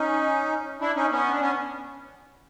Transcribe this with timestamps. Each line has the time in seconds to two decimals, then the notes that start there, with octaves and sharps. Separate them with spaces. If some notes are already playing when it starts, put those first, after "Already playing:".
Already playing: C#4 D#4
0.81 D4 E4
0.96 C#4 D#4
1.11 B3 C#4
1.31 D4
1.40 B3 C#4